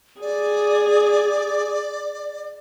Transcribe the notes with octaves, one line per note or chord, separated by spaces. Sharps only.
G#4 D5